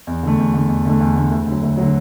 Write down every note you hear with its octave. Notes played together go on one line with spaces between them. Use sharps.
E2
D3 A3
E2
D3 A3
E2
D3 A3
E2
D3 A3
D2
D3 F#3
D2
D3 F#3